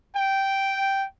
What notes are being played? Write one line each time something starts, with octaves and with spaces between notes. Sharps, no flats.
G5